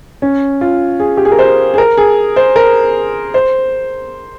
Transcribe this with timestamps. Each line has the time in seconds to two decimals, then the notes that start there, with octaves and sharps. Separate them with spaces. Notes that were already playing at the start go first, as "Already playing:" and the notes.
0.22 C#4
0.61 F4
1.00 G#4
1.17 G4
1.25 G#4
1.32 A#4
1.39 C5
1.74 G#4
1.78 A#4
1.97 G#4
2.36 C5
2.56 A#4
3.34 C5